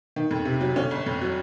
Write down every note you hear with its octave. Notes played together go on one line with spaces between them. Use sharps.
D#3
F2
C3
F#3
D3 C#4
G1
F2
F#3